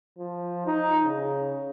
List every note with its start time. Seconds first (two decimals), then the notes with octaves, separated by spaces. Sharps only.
0.18 F3
0.67 D#4
1.04 C#3